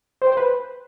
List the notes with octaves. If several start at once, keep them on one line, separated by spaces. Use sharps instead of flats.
C5
G5
C5
B4